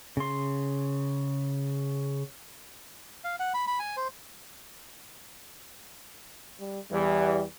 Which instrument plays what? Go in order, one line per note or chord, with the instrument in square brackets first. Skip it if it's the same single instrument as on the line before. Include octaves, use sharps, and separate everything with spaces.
[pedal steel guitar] C#3 C6
[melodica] F5
F#5
B5
B5
G#5
C5
[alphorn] G3
[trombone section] E2 E3 [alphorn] G3